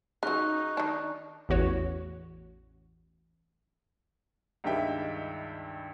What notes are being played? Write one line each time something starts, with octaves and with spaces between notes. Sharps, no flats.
C#3 F#3 D#4 C#6 F#6
D#3 D4
A1 E2 F#4 C#5
C#2 G2 D#3 G4 E5 G5